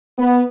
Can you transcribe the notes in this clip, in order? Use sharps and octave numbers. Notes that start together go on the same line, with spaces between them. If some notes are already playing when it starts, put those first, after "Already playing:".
B3